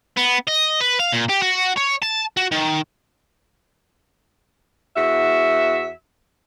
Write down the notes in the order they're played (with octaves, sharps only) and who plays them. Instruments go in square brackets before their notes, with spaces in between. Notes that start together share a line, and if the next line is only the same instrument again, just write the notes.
[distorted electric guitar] B3
D#5
B4
F5
A#2
G4
F#4
C#5
A5
F#4
D#3
[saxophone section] E2 F#4 E5